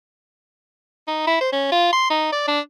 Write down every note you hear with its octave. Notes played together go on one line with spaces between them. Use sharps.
D#4
E4
C5
C#4
F4
C6
D#4
D5
D4